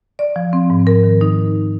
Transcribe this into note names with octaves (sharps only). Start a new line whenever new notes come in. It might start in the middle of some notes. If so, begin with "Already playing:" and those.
D5
F3
C4
G#2
A#4
D#3
D#4